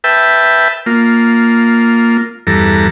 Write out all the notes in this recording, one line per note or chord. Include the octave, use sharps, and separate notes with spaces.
B4 E5 G5 A5
A#3 F4
E2 G2 A4 A#5